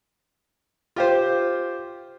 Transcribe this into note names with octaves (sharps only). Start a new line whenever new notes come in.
F4 G4 C5